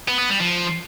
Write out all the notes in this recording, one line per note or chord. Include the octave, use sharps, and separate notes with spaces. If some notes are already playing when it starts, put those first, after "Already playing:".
B3
B3
G3
F3